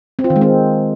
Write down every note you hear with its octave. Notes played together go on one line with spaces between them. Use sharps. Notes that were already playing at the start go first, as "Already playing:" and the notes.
C4
F4
D#3
G#3
C4